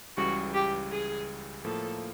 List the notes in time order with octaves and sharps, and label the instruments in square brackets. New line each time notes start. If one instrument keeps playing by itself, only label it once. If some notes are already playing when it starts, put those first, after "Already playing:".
[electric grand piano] C#2 C#3 E3 G3 [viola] F#4
[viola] G4
G#4
[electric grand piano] A2 F3 A#3 [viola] A4